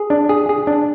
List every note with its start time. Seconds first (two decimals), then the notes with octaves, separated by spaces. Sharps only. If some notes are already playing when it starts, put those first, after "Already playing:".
Already playing: G#4
0.10 D4
0.29 G#4
0.49 G#4
0.67 D4